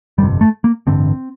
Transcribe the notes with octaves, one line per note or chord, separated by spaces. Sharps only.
G1 F2 C3 G3
A3
A#3
A1 G2 D3 C4